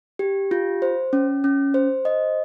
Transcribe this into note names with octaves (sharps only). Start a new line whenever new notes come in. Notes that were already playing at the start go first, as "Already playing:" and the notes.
G4
F4
C5
C#4
C#4
C5
D#5